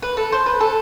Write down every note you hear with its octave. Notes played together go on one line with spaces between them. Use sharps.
B4
A4
C5
B4
A4